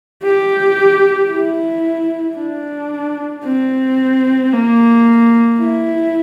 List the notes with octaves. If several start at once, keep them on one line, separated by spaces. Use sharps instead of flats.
G4
E4
D4
C4
A#3
E4